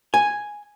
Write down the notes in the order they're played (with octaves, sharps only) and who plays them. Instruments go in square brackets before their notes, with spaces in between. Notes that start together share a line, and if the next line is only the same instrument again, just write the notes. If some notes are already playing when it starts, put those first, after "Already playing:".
[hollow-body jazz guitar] G#5